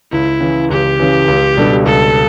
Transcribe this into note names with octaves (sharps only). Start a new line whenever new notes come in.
C#2 E4
C#3 E3
C#2 G4
C#3 E3
C#2
B2 G3 D4 A4
C#2 A4